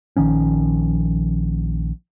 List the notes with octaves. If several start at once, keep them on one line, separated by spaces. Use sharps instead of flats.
A#1 D#3 F3 C#4